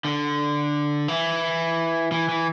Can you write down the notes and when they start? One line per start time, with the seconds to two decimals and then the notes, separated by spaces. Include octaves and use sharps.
0.05 D3
1.08 E3
2.12 E3
2.29 E3